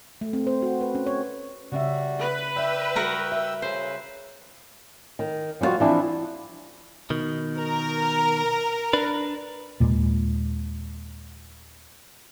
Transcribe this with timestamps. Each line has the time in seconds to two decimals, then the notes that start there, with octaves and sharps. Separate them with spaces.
0.21 A3
0.33 C4
0.47 C5
0.62 F#4
0.81 B4
0.95 C#4
1.06 C#5
1.72 C#3 G3 C#4 F#4 E5
2.20 B4
2.56 D5 E5 G5 E6
2.96 G3 F#4 A#4 A#5
3.32 E5
3.62 C#3 B4 C5
5.19 D#3
5.61 F3 G3 C#4 F4 F#4
5.80 E3 F3 C4 D4 E4
7.10 B2 D#3
7.58 A#4
8.93 D4 B4
9.80 D#2 A#2 G#3